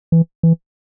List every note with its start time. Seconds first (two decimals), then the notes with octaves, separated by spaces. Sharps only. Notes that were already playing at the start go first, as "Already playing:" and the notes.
0.12 E3
0.43 E3